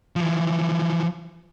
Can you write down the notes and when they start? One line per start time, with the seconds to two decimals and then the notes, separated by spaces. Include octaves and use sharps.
0.16 E3 F3